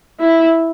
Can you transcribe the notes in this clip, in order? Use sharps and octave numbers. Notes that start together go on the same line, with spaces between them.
E4